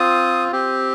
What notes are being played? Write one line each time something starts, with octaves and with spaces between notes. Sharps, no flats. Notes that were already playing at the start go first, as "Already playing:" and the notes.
Already playing: C4 F4 D#6
C4 G4